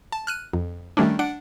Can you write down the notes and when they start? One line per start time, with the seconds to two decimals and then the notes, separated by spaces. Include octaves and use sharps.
0.12 A5
0.27 F6 F#6 D#7
0.53 F2
0.97 D#3 G3 A3 C#4 D4
1.19 D4 F#5 D7